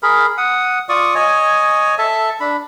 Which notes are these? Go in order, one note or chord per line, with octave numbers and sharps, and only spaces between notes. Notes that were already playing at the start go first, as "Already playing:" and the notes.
G#4 A#4 B5
F#5 D#6
F4 D5 C#6 D#6
C#5 D#5 G#5
A4 E5 A5
D4 B5